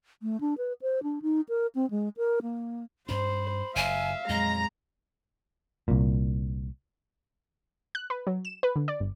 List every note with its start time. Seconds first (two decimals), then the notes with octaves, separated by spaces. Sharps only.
0.22 A3
0.41 D4
0.58 B4
0.82 C5
1.03 D4
1.22 D#4
1.49 A#4
1.75 C4
1.91 G#3
2.17 A#4
2.42 A#3
3.09 G2 C#4 C5 B5
3.76 F#1 E5 F5 G#5
4.29 F2 A#2 F#3 G#3 D#5 A#5
5.88 C2 A#2
7.95 F#6
8.10 B4
8.27 F#3
8.45 E7
8.63 B4
8.76 D3
8.88 D5
9.00 G1